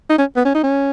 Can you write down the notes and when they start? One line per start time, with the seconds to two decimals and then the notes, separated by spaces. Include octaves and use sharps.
0.10 D#4
0.18 C#4
0.36 B3
0.45 C#4
0.54 D#4
0.63 C#4